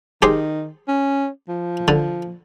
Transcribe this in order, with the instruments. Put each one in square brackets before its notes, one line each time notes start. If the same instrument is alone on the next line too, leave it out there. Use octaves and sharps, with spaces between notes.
[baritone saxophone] D#3 [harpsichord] G4 G#4 C5
[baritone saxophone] C#4
F3
[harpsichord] D3